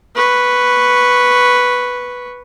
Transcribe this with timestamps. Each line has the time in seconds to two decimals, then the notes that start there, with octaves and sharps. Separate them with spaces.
0.16 B4 C#6